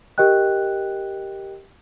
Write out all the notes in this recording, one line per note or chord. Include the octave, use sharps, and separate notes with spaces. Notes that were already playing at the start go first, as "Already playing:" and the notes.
G4 A#4 D#5 G5 F#6